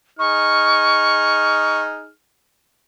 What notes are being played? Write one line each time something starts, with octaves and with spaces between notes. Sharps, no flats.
D#4 G#4 C#6 F6